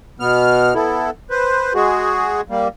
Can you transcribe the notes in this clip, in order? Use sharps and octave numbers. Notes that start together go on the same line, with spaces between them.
B2 B3 F6
B3 E4 A4
B4 C5
G#3 F#4 G#4
G3 A#3